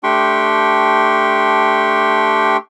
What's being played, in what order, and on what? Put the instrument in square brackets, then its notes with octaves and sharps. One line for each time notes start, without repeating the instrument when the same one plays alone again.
[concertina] A3 D4 G4 G5 C6 C#6